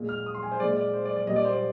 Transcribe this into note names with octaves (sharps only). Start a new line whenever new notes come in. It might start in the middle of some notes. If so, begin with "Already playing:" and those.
Already playing: A#2 G#3
F6
D#6
C6
G#5
C5
A#2 G#3 D5
D5
C5
D5
D5
A#2 G3 A#3 D#5
D5
C5
D5